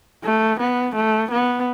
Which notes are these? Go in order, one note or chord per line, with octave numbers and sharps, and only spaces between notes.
A3
B3
A3
B3